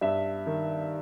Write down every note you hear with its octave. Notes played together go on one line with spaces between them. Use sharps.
G2 E5
D#3